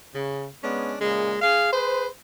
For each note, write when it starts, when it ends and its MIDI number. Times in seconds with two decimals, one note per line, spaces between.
0.14 0.47 49
0.62 0.95 56
0.62 0.95 59
0.62 0.95 61
0.62 0.95 62
1.01 1.37 46
1.01 1.37 49
1.01 1.37 56
1.42 1.69 68
1.42 1.69 77
1.72 2.06 68
1.72 2.06 71
1.72 2.06 72